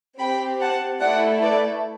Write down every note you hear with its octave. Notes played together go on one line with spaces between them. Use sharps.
C4 G4 G5 B5
F#5 A5
A3 E4 A4 D5 F#5
B4 D5